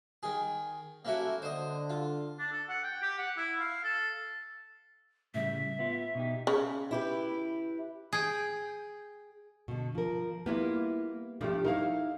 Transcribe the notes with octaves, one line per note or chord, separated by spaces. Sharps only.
D#3 G#4
A#3 C#4 E4 F#4 A4 E5
D3 C5 D#5
F4
D4
A4
F#5
G5
G4
F#5
E4
F5
A4
A2 C#3 G3 E5
B3 F4
B2 D#4 G4
C#3
E4 G4 B4
G#4 G5
B2 D3
F3 A#4
G3 A#3 B3 E4 F4
G2 F3 A3 D4 E4 G4
D#4 E4 A#4 C#5 F5